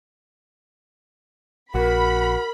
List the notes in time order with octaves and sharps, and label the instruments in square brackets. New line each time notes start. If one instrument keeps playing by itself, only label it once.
[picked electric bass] A#1 [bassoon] F#4 [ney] A#4 [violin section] B5